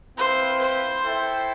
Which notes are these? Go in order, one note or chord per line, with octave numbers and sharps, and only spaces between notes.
C4 E4 B4 C5 F5
C5
E4 A4 E5 G5